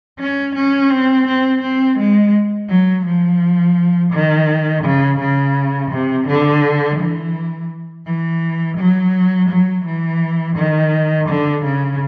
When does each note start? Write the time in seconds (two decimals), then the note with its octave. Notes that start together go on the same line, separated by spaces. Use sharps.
0.19 C#4
0.55 C#4
0.90 C4
1.27 C4
1.62 C4
1.98 G#3
2.69 F#3
3.06 F3
4.13 D#3
4.84 C#3
5.20 C#3
5.91 C3
6.27 D3
7.00 E3
8.06 E3
8.78 F#3
9.50 F#3
9.85 E3
10.56 D#3
11.29 D3
11.65 C#3